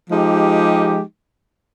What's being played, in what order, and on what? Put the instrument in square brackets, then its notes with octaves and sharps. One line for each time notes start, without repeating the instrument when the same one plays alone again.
[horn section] F3 G#3 D#4 G4